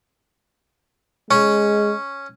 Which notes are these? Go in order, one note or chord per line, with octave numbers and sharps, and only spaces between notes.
G#3 C#4